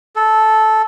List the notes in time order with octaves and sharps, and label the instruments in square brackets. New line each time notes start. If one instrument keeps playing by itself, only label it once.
[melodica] A4